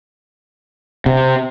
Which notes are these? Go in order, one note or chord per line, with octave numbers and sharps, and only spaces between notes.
C3